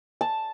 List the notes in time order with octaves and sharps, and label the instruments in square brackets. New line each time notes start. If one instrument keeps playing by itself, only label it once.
[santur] A5